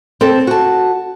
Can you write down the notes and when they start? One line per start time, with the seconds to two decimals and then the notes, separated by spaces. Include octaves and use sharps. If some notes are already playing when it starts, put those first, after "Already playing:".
0.21 C4 A4
0.47 F#4 A5